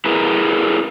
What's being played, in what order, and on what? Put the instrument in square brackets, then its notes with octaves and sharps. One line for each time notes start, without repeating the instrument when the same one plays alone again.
[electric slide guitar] E4 G#4 A#4 B4